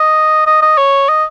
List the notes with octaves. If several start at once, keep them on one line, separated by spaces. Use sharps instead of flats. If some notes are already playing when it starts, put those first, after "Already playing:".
Already playing: D#5
D#5
D#5
C#5
D#5